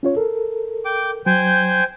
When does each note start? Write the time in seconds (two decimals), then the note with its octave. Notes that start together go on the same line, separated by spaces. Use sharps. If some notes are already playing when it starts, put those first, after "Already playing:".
0.03 C#4 F4 C#5
0.17 A4 A#4
0.85 G5 D6
1.26 F#3 C5 G5 G#5